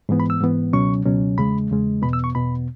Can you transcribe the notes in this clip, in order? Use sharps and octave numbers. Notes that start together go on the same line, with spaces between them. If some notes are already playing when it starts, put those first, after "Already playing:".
G#2 E3 B3
B5
E6
G#2 E3 B3
C#2 B2 F#3 C#4 C#6
C#2 B2 F#3 C#4
E2 C#3 G#3 B5
E2 C#3 G#3
E2 B2 B3 B5
E6
C#6
E2 B2 B3 B5